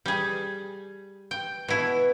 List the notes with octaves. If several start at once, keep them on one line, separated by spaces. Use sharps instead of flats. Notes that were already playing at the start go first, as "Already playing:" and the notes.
G3 G#4
G5
B2 E4